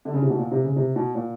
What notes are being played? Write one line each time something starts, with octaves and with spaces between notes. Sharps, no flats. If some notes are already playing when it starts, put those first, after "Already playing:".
D3
C#3
C3
B2
A#2
C3
C#3
C3
B2
A#2